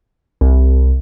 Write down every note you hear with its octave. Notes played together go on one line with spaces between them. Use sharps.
C2